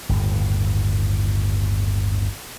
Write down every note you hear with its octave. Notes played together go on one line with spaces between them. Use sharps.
G1 D#2 A2